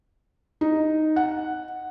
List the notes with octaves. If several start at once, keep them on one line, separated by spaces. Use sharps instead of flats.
D#4
F#5